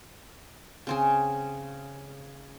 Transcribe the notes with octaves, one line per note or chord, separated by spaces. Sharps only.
C#3 C4 G#4